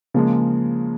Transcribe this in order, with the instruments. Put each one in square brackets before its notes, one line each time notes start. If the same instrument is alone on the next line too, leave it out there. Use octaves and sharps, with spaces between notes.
[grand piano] C#3 F3 G#3 [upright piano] A#3